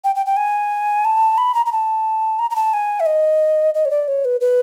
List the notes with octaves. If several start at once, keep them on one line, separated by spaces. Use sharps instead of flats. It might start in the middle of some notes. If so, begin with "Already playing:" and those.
G5
G5
G5
G#5
A5
B5
A#5
A#5
A5
A#5
A#5
A5
G#5
E5
D#5
D#5
C#5
D5
C#5
B4
B4